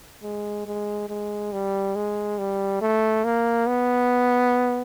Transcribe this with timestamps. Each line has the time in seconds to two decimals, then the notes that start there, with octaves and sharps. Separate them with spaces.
0.23 G#3
0.66 G#3
1.09 G#3
1.52 G3
1.96 G#3
2.38 G3
2.81 A3
3.25 A#3
3.67 B3